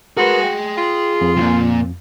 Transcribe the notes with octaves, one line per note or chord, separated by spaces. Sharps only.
F#4 G#4 A#4 B4 C6
G5
F4
F2
C2 A#2